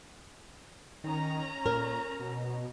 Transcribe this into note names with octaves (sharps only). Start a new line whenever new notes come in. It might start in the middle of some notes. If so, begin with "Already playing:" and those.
D#3 C#4 A#5
A#2 A#4
B2